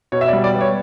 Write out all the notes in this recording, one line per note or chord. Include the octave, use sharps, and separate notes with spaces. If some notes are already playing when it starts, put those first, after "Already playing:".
B2 C#5
E5
D5
G3
D5
B3
C#5